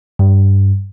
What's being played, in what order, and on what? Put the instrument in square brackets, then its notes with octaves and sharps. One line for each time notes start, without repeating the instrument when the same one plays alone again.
[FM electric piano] G2